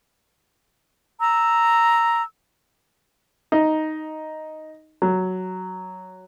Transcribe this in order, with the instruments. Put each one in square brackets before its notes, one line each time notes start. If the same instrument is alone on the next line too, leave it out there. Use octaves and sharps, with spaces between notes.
[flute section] A#5 E6
[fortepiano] D#4
F#3